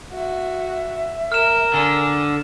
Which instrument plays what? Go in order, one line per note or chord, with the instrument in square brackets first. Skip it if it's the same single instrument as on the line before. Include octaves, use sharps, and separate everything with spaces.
[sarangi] F#4 [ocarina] E5
[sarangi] A#4 [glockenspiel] F6 E7
[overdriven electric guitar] D3 [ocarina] G#5